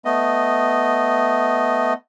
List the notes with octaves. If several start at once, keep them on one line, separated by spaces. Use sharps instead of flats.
A3 B3 D#5